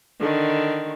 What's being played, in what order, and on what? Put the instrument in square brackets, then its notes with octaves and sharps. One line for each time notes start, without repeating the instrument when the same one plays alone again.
[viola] D3 D#3